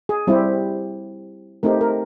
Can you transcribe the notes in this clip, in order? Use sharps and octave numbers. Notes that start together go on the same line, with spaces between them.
G#4
G3 C4 E4 G4
A3 C4 D#4 G4 A#4
A#4